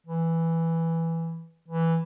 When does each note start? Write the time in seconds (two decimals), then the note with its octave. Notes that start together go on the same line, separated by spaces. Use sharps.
0.07 E3
1.68 E3